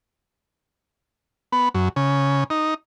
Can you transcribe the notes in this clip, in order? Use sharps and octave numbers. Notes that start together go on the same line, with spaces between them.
B3
F#2
C#3
D#4